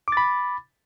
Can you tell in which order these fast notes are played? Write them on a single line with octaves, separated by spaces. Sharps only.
D6 A6 B5